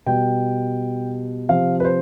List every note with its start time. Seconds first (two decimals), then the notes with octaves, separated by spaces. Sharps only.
0.07 B2 G3 G5
1.49 C3 F3 F5
1.80 B4
1.85 C5